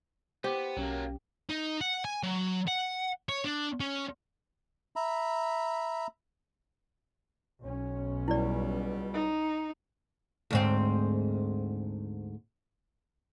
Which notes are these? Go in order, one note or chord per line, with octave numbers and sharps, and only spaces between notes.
B3 G4 C5
B1 F#3 A#3 C#4
D#4
F#5
G#5
F#3
F#5
C#5
D4
C#4
E5 A#5 B5
B1 C#4
C#2 B2 G3 E4 D5
D#4
D2 G#2 C4